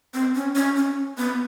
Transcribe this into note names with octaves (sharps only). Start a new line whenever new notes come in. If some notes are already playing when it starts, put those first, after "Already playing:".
C4
C#4
C#4
C#4
B3